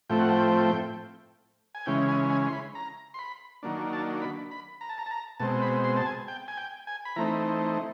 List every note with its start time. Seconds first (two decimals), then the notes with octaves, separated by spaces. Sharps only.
0.10 A2 F3 A3 C4 G5
0.19 F#5
0.30 G5
1.75 G#5
1.86 C#3 E3 G#3 C#4 G5
2.09 G#5
2.30 G#5
2.48 C6
2.53 B5
2.75 A#5
3.14 C6
3.19 B5
3.63 D#3 F#3 A#3 D4
3.93 A5
4.22 B5
4.51 B5
4.81 A#5
4.89 A5
4.98 A#5
5.06 A5
5.11 A#5
5.40 B2 G#3 C4 A5
5.62 B5
5.84 C6
5.96 A5
6.06 G#5
6.28 G5
6.48 G#5
6.57 G5
6.87 G#5
7.05 B5
7.16 E3 A3 C4 D#4 A#5